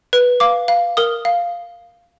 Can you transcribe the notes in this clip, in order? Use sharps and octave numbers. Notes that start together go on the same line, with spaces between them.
B4
F5 D6
F5
A#4 D#6
F5